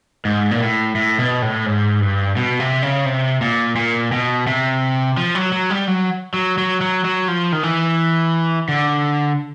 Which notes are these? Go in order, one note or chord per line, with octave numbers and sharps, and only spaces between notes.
G#2
A#2
A2
A2
B2
A2
G#2
G2
B2
C3
C#3
C3
A#2
A#2
B2
C3
F3
F#3
F#3
G3
F#3
F#3
F#3
F#3
F#3
F3
D#3
E3
D3